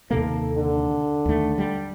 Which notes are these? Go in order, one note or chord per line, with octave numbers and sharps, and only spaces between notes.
D#2 C3 A#3 A4
D3
D#2 A3
G3